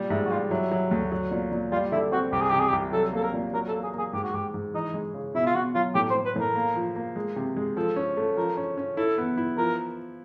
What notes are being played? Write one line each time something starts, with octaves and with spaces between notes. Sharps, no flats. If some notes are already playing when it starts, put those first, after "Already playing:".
Already playing: A#2 G3
G#2 E4
F#4
G3 F4
F#3 E4
F#3
D2
F#3
A#2
A#2
G3 F4
D3 E4
C4 F#4
C2 G4
G#4
C3 G4
G#4
G4
C2
F#3 A4
A#3 A4
A#4
A#2
F#3 A#4
A4
A#3
G#4
A#3 G#4
G#2 G4
F#4
G#2 G4
G#2
E3 D#4
G#3
C#3
B2 E4
F4
B2 F#4
F#3 F4
A2 G4
C5
A2
B4
A2 A#4
A#3
F3
A#3
G#3
C3
G#3
F3 A4
C#4
A3
F3 A#4
C#4
C#4
E4 A4
B3
E4
F3 A#4